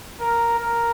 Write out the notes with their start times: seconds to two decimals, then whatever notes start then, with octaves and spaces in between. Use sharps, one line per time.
0.20 A#4
0.59 A#4